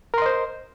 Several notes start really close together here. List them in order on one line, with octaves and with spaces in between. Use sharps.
A#4 C6 D#5 C5